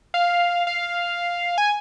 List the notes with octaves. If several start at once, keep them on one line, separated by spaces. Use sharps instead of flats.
F5
F5
G#5